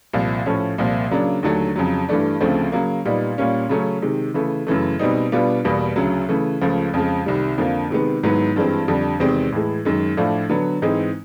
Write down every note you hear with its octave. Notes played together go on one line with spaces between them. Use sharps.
C2 A#2 F3
A2 F3 A3 C#4
C2 A#2 F3 A#3
C#3 F#3 A#3 D4
D#2 D3 F#3 A3
F2 C#3 F#3
G2 E3 A3 D4
D2 C#3 F3 A3 C4
C#3 F#3 A#3
A#2 G3 B3 D#4
A#2 G3 A#3 C#4
C#3 F#3 A3 C#4
C3 D#3 G#3
C#3 E3 A3
F#2 C#3 E3 A3
B2 G3 C4 D#4
B2 G3 B3 D4 F4
E2 B2 G3 A#3
D2 C#3 F#3
C#3 E3 A3
C#2 C#3 F3 A3
F2 C#3 F3 G#3
C2 C3 D#3 G3
F2 D3 F3 A#3
C3 D#3 G#3 B3
G#2 D#3 F#3 B3 E4
G2 E3 G#3 C4
F2 D3 G3
E2 C3 D#3 G#3 C4
A2 E3 G#3
F#2 D#3 G#3
A2 F3 A3 D4 F4
D3 F#3 B3
G#2 E3 G#3 C4 D#4